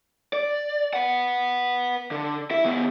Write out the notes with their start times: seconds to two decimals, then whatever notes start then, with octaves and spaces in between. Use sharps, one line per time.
0.33 D5
0.93 B4 F#5
2.11 D3
2.51 E4 E5
2.65 D#3 B3